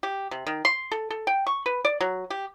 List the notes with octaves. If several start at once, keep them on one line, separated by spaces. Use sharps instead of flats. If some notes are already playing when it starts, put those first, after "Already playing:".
G4
C3
D#3
C6
A4
A4
G5
C#6
B4
D5
F#3
G4